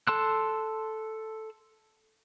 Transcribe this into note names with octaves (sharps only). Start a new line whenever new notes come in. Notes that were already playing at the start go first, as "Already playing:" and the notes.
A4 A5 C6 E6 F#6